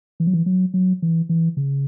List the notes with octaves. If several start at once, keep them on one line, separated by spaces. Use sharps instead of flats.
E3
F#3
E3
F#3
F#3
E3
E3
C#3